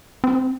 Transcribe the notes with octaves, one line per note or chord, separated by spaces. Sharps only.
C4